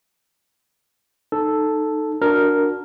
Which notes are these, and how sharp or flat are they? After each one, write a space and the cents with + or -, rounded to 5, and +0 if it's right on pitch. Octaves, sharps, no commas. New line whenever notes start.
D#4 -15 A4 +0
D4 +0 F#4 -20 A#4 +0